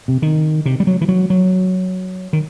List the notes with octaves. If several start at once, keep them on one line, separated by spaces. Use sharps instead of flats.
C3
D#3
C3
G3
F#3
E3
F#3
F#3
D#3